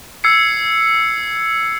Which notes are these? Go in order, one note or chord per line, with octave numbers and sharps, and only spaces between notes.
E6 G#6 C7 C#7